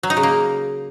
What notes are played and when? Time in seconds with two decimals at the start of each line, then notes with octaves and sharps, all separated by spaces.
0.03 F#3
0.10 D#4
0.17 C#3
0.23 A#3